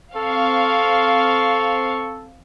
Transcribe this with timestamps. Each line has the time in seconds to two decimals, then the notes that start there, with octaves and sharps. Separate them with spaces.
0.16 C4 A4 F5 C#6